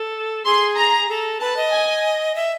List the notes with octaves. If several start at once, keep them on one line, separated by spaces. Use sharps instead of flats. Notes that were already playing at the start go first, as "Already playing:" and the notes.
Already playing: A4
G#4 C6
A#5
A4
B4 A5
D#5
G#5
E5